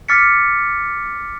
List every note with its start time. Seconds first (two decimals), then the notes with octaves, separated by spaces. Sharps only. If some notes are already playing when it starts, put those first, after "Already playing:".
0.08 D6 F6 A6 B6 C#7